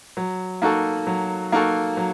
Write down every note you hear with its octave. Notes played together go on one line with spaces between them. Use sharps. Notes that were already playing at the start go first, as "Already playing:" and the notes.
F#3
A#3 D#4 F#4 A4
F#3
A#3 D#4 F#4 A4
F#3